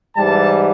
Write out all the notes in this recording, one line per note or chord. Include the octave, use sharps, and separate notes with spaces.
G#2 E3 G3 A5